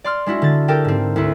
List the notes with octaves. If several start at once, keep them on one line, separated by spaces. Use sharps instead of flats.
D5 C6 F6
G#3 D4 E4 F#4
D3 A6
G4 A4 A#4 G5
G#2 C4
D2 E4